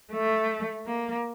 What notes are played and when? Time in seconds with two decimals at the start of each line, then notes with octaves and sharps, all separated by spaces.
0.12 A3
0.87 A#3